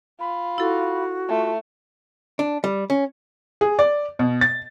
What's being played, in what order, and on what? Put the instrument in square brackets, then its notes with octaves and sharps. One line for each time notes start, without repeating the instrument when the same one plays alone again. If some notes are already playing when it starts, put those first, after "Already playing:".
[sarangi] F4 [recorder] B5
[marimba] E4 A4 [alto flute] F#4
[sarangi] A3 [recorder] F4
[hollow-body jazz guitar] D4
G3
C#4
[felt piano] G#4
D5
B2
A6